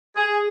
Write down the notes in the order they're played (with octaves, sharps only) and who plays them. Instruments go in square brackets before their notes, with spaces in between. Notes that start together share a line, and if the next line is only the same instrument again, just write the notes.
[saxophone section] G#4